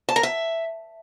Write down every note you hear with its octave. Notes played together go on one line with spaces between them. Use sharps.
A5
A#4
E5